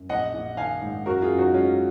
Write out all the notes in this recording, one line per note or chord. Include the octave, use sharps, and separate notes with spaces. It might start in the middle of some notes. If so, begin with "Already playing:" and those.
Already playing: F#2
A#1 D#5 F#5
A#1
D#3 F5 G#5
G#2
F#2 F#4 A#4
F4 G#4
F#2
D#4 F#4
G#3 C#4 F4